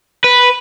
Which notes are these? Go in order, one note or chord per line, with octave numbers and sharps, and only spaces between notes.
B4